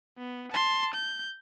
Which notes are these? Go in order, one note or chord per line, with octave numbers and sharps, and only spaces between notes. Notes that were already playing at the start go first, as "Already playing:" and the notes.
B3
A5 C6
G6